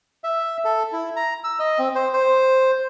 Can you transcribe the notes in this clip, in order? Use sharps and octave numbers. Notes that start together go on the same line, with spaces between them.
E5
A4
E4
A#5
E6
D#5
C4
C5
C5